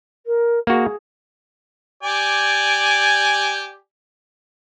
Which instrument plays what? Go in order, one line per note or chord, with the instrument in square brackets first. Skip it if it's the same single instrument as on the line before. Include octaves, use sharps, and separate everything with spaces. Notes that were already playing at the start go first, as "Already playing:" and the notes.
[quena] A#4
[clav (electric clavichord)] A#3 F#4 [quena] G#4
[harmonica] G4 D5 G#5